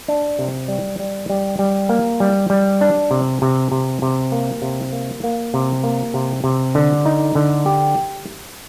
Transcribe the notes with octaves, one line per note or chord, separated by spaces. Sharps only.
D4
C3
G3
G3
G3
G3
A#3
G3
G3
D4
C3
C3
C3
C3
A#3
C3
A#3
A#3
C3
A#3
C3
C3
D3
D#4
D3
G4